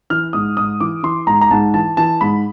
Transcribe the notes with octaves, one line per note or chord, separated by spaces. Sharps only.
E3 F6
G#2 D#6
G#2 D#6
E3 D6
E3 C6
G#2 A#5
A#5
G#2 A5
E3 A5
E3 A5
G#2 B5